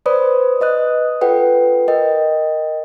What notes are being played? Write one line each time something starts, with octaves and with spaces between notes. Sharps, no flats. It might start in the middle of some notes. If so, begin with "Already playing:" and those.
B4 C5 D5 B5 D#6
B4 D#5 D#6 F#6
F4 A4 B4 F#5 G5
A#4 D#5 G5